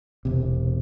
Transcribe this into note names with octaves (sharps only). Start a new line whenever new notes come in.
E1 C3